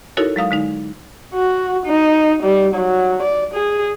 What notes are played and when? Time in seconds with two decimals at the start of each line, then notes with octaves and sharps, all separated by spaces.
0.17 D#4 E4 F#4 A4 A#4 C#5
0.36 F#3 G#3 F5 D#6
0.51 D3 G#3 D#4
1.34 F#4
1.86 D#4
2.43 G3
2.75 F#3
3.23 D5
3.54 G#4